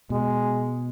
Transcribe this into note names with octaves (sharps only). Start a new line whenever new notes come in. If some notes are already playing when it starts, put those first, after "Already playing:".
B2 G#3